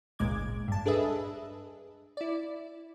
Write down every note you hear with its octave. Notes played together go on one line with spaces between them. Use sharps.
G#1 C#2 A#2 G#3 D6 G#6
G2 A5
D4 G#4 A4 B4 D#5 E5
E4 D5